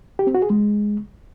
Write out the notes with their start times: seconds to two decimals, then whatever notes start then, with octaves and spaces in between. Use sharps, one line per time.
0.19 G4
0.27 C4
0.35 F#4
0.42 G#4
0.50 G#3